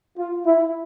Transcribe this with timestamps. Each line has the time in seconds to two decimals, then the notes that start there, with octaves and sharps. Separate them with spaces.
0.18 F4
0.45 E4